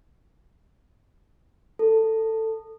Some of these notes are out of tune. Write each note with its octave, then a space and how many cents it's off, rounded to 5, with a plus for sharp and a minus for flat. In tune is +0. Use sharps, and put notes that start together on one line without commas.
A4 +15